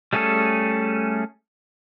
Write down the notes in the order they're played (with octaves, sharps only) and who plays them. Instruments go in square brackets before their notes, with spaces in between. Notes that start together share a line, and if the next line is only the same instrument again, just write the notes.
[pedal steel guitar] G3 A3 C#4 G#4 A4